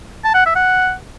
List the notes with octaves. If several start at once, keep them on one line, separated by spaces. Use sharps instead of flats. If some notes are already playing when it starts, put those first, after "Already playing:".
A5
F#5
E5
F#5